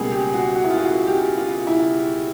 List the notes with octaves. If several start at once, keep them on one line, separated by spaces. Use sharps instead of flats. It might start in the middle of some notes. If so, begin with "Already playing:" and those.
Already playing: C#2 B2 G3 A#3 G#4
G4
F#4
F#4
E4
F4
F#4
G4
F4
E4